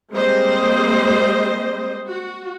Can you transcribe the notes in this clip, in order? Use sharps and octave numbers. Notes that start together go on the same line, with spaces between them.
G3 G#3 A#3 C4 C5 D#5
F#4